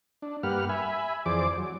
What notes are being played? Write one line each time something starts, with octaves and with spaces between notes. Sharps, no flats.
D4
G2 A#3 G4 B4 F#5 F6
E5 G#5 B5
F2 E3 G#4 C5 D5 D6
F#3